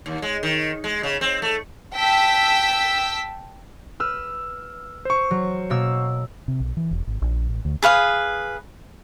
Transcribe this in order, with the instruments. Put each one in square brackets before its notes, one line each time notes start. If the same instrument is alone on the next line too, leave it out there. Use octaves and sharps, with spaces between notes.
[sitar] D#2
G#3
D#3
G#3
C#3
C4
A3
[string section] G5 A5 E6 B6
[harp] B4 [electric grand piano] E6 F6
[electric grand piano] C5 C#6
[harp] F#3
B2 A#3 E6
[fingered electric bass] C3
B1
E3
E1
G#1
A#1
A1
D2
[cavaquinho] G#4 B4 F5 D#6